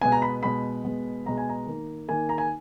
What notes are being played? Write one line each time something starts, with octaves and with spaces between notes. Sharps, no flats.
B2 G#3 B3 G#5
A#5
B5
B2 G#3 B3 B5
B2 G#3 B3
B2 G#3 B3 A#5
G#5
A#5
D#3 A#3
D#3 A#3 G#5
A#5
G#5